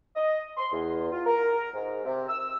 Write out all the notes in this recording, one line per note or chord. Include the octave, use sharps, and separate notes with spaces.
D#5
C6
E2
F4
A#4
G#2
C3
E6